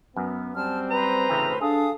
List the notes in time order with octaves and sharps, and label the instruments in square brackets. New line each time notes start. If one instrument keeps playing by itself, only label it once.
[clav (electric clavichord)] F#2 [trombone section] B3
[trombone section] G3 C4 [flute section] A5 F6
[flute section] B4 C5 [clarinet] A#5
[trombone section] D2 A2 A3 [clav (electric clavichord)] C#3 E3 C4
[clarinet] D4 [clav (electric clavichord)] G#4 [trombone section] A4 [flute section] F5 D#6